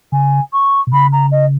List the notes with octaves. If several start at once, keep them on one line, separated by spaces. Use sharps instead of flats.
C#3 G#5
C#6
B2
C#3 B5
A#5
D#5